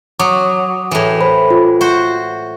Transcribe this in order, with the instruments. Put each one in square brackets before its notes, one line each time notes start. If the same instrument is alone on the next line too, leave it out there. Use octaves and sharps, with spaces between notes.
[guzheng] F#3 [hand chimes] D6 D#6
[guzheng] A2 E3
[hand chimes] A4 C5 B5
F4
[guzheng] F#4 C5